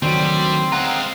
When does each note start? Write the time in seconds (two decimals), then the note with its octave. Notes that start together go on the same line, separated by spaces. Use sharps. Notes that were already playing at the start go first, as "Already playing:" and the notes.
0.02 D2 D#3 F#3 G3 C4 C6
0.72 G#3 F4 F#5 A#5